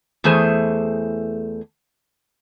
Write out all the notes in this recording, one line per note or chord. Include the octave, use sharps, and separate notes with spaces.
E2 E3 A3 G#4 C5